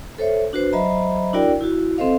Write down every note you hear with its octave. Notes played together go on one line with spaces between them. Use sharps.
A4 C5 C#5 E5
D4 F#4 B4 C5
F#3 C5 D#5 E5 A#5 B5
D4 E4 F#4 A#4 D5 G5
E4 F#4
C4 A4 C5 D#5 F5